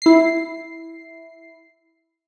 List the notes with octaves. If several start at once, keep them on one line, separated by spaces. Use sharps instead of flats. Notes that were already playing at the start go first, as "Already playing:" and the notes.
E4 C7